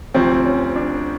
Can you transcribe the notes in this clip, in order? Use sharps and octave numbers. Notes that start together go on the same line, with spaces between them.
D2 C3 F3 C4
C#4
D4